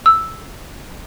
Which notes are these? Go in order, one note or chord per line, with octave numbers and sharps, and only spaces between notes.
E6